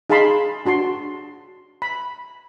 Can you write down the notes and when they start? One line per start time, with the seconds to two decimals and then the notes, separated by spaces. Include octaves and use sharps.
0.10 D#4 G#4 F5 A5 B5 C6
0.65 D4 F#4 A5 C6
1.82 B5